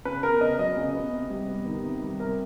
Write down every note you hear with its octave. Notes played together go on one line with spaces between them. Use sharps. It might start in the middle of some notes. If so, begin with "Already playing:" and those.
C#3 B4
B3 A#4
C#3 D#5
F#3 D#5
C#3
B3
C3
G3
B3
D#3
C3
G3
C3 A#4